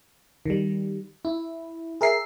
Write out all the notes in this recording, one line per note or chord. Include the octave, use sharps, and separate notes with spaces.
D#3 G3
E4
G#4 A#4 E5 C7